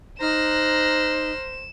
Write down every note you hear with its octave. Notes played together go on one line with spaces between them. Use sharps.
D#4 C5 A#5 F6 F#6 E7